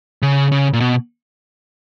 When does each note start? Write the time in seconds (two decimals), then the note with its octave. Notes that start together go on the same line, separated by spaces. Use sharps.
0.22 C#3
0.52 C#3
0.73 A#2
0.80 B2